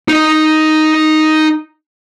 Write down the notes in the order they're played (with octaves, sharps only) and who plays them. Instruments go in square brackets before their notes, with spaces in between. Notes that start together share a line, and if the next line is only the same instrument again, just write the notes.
[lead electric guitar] D#4 D#5